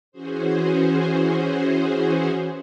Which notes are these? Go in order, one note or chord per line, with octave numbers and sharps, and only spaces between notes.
E3 C#4 F#4 G#4 C5